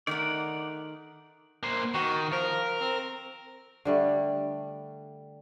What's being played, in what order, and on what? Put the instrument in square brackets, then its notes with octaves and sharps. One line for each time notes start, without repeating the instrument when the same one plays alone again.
[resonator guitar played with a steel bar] D#3 A3 D#4 [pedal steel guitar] D5 F#5
[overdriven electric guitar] A#3 C5
[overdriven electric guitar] D#3 [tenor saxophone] F#4
[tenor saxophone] F3 [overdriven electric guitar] A#4
[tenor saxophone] C4
[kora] D3 G3 A3